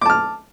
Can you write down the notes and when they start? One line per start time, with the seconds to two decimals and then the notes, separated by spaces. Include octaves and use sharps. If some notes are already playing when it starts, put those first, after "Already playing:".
0.01 D6
0.05 A5
0.10 F6